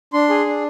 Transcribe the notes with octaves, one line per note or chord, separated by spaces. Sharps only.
D4 C6
G#4
D4